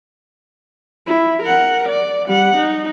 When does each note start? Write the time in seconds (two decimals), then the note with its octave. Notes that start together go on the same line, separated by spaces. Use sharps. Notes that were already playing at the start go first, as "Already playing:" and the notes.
1.06 E4
1.42 A#4 F#5
1.88 D5
2.27 G3 F#5
2.57 D#4